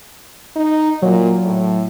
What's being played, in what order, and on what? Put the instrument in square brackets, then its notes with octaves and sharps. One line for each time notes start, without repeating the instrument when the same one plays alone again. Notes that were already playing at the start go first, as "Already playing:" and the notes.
[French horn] D#4
[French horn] A#2 [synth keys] F#3
[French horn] A2